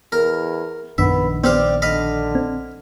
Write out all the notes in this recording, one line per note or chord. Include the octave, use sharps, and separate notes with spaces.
E2 A#4
A#1 F#2 D#3 B3 D4 E5
B3 C4 G4 D5 F5
D3 D#5 F5 B5
C4